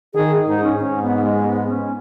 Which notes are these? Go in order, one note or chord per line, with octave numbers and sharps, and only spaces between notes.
D#3 G#4
G#2 D#4
C#4
G#2 C#4
B3
G#3
B3
C#4